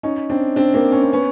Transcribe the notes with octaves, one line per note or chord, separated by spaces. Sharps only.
C#4 D#4
C4 D4
C4 D4
A#3 C4
C#4
C4
B3 C#4